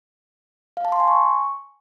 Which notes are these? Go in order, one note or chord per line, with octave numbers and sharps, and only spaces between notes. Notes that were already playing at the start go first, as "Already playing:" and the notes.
F5
A5
C6
G#5
C#6